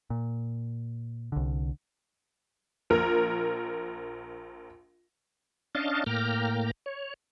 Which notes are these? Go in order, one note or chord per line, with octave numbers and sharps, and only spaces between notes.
A#2
C2 D3
A#1 A#4
C#4 D4 D#5 F5 A5
A2 A#3 G5 A#5 F6
C#5